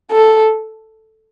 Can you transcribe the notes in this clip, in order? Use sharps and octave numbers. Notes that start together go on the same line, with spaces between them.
A4